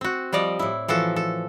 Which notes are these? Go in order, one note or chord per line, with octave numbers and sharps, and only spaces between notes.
C4 F#4
F3 G3 D5 D#5
A2 E4
E3 F3 F#4 A4
A4